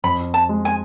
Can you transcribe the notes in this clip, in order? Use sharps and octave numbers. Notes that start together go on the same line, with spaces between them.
F2 B5
A5
G#3
G#5